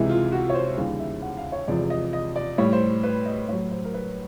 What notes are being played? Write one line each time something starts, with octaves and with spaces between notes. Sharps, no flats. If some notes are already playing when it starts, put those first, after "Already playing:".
Already playing: C#2 C3 E3 G#3 E4
F4
F#4
C#5
C5
D#2 C#3 E3 G3 F5
E5
F#5
F5
C#5
E2 C3 F3 G#3 D5
D#5
D#5
D5
A2 E3 G3 C#5
C5
B4
D#5
A2 F#3 C#5
C5
A#4
B4